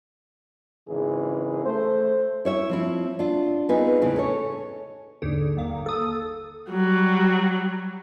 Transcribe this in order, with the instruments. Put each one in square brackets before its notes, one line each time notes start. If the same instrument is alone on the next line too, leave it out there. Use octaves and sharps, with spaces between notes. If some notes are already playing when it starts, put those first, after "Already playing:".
[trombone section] G#1 C#3 E3 G#4
A3 C5
[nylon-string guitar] E4 C#5 E5
F3 C4 E4
D4 F4
B3 C4 D#4 F4 G#4 B4
E2 A2 C#3 E3
C#4 A4 C#5
[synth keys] D#2 G#2 D3
G1 D#2 A#3
A4 D#6
[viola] F#3 G3